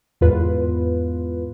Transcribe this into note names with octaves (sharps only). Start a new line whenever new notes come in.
E2 G#2 F4 B4